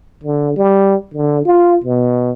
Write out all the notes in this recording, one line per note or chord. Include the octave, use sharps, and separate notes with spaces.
D3
G3
D3
F4
B2